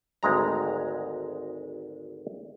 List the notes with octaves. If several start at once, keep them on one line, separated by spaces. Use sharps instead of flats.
G#1 D2 G#3 A#5